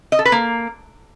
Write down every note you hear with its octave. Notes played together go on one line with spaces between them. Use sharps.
D#5
A4
B4
A#3